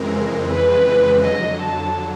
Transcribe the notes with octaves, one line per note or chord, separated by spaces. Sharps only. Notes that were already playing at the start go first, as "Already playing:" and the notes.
Already playing: F2 C#3 E3 G#3 C4 A#4
B4
F2 D3 F#3 D#5
A5